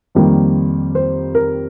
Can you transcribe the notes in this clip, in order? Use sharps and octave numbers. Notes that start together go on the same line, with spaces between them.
F2 D#3 G3 A#3
C5
A#4